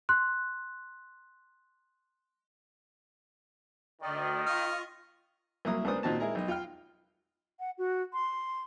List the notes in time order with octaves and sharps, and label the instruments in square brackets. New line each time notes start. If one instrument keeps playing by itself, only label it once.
[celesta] C6 F#6
[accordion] D2 D5 D#5 [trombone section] D#3
[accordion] F4 C#6 [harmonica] D#5 F6
[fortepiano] C2 F#3 A#3 E4 A#5 D#6
C#2 B3 D4 A#4 C5 D#6
A#2 D#3 C4 F#4 D#5 A5
G#3 E4 G#4 A#4 D#5
B1 D#5
F4 F5 G5 F6
[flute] F#5
F#4
C6